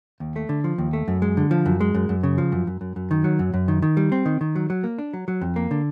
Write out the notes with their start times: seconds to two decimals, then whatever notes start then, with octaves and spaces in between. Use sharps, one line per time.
0.20 D#2
0.36 A3
0.49 D3
0.64 F3
0.78 D#2
0.93 A3
1.08 F#2
1.22 G#3
1.37 D3
1.51 F3
1.66 F#2
1.81 G#3
1.94 F#2
2.09 F#2
2.23 C#3
2.38 F3
2.52 F#2
2.67 F#2
2.81 F#2
2.96 F#2
3.11 D#3
3.24 F#3
3.39 F#2
3.54 F#2
3.68 D#3
3.82 D#3
3.97 G3
4.12 C4
4.26 D#3
4.41 D#3
4.55 F#3
4.70 F#3
4.84 A#3
4.98 D4
5.14 F#3
5.28 F#3
5.42 F2
5.56 A#3
5.71 D3